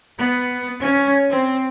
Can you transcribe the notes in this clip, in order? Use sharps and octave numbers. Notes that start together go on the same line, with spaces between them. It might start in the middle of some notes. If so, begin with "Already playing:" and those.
B3
C#4
C4